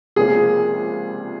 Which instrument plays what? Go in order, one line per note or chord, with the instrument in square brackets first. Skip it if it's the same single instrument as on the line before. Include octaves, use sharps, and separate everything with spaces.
[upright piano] C#2 C3 F3 A#3 D4 [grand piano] G#4